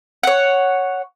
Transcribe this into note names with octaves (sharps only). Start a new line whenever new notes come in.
C#5 F#5